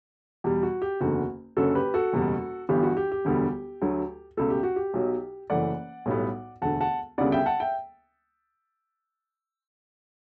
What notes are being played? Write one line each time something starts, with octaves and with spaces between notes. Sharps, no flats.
E2 B2 G3 G4
F#4
G4
F#1 E2 D3 F#4
F#1 F#2 D3 F#4 A4
G4 B4
F#4 A4
F#1 E2 B2 G3
G1 G2 E3 B3 G4
F#4
G4
G4
E1 D2 D3 G3 B3
D2 D3 F#3 A3
C#2 B2 A3 A4
G4
F#4
G4
B1 B2 F#3
F#1 F#2 E3 A3 D5 F#5
B1 A2 G3 B3
E1 D2 D3 A3 F#5 A5
F#5 A5
D2 C#3 G3 B3 D5 F#5
E5 G5
F#5 A5
E5 G5